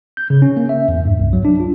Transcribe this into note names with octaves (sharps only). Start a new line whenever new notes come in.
G6
C#3
C#4
A#3
E5
E2
G2
C2
F#3
D4
F4